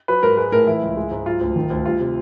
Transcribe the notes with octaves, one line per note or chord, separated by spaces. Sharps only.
F#3 B4
G#2 A#4
G#3 B4
A2 A#4
E3 E4
C#2
G#3
G#2
F#3 F4
D2
D#3
D2
G3 F4
C3